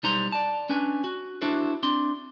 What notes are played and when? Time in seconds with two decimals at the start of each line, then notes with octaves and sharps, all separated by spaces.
0.03 B1 G3 D#4 C5 A#5 C6
0.32 D5 A5
0.69 C#4 D4 B4 G#5
1.04 F#4
1.42 D4 E4 F#4 A4 C5
1.83 C4 D4 C6